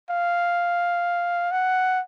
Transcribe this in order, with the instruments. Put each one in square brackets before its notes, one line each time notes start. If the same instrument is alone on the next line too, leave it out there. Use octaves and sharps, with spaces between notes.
[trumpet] F5
F#5